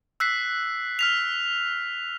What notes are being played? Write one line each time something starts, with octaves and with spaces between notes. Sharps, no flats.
E6 F#6 B6 C7
F6 B6 F7